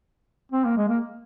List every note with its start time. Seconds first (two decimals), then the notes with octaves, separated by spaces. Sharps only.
0.52 C4
0.65 A#3
0.77 G#3
0.89 A#3